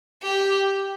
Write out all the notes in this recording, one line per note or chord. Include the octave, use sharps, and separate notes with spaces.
G4